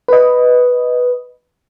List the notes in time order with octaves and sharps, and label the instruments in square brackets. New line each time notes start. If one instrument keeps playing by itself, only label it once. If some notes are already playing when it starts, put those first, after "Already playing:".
[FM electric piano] B4 D#5